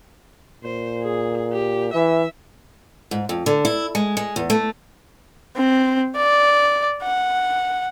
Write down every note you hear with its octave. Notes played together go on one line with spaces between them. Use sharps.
A#2 C5
G#4
G4
E3 E5
G#2
F2
D3
E4
G#3
G#3
E2
A3
C4
D5
F#5